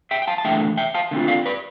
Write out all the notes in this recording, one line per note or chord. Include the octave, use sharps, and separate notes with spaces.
E5 G5
G5
F5 A5
A5
E2 D3 A3 E5 G5
E5 G5
F5 A5
D3 A3 C4 F4
D5 F5
B4 D5